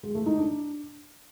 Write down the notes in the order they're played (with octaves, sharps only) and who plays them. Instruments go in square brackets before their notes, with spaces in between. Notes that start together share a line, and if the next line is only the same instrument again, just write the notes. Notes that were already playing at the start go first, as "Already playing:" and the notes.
[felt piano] G#3
A3
D#4
D4